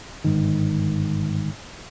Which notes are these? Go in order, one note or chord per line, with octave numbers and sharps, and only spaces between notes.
G1 G#2 D#3